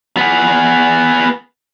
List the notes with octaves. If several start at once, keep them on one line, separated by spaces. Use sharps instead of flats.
B3 G#4